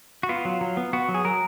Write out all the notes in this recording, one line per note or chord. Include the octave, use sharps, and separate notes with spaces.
F#4
B3 F4
F#3
F#3
B3
B3 F#4
F#3
G#4
F#3 A#4